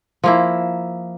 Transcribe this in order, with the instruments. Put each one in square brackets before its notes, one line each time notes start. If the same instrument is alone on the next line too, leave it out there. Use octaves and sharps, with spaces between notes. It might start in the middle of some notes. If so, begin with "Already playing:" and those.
[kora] F3 A#3 E4